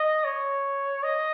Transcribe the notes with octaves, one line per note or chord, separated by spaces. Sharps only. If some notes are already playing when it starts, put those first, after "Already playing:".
Already playing: D#5
C#5
D#5